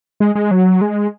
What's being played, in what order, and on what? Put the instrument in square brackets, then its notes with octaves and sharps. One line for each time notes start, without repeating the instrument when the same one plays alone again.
[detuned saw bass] G#3
G#3
F#3
G#3